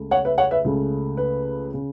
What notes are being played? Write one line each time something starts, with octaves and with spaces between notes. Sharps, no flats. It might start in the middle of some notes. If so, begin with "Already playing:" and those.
Already playing: C#2 C#3 A3
C#5 F#5
B4 E5
C#5 F#5
B4 E5
C#2 C#3 A3
B4
C#3